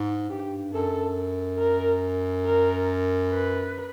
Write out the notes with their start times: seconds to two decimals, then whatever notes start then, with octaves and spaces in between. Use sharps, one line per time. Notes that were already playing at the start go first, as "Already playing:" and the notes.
Already playing: G#2
0.30 G2 G4
0.73 F#2 A4
1.59 A#4
2.45 A#4
3.30 B4